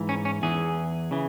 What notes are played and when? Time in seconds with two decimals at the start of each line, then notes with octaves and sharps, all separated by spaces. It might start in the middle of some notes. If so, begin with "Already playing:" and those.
Already playing: G#2 E3
0.09 C#4
0.25 C#4
0.42 E2 E3 G#4
1.11 C#3 E3